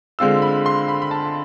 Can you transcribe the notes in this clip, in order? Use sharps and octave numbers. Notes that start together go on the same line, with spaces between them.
D3 G#3 C4 F4 E6
B5
C6
B5
B5
A5